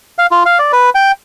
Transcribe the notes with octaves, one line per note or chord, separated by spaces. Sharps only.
F5
F4
F5
D5
B4
G5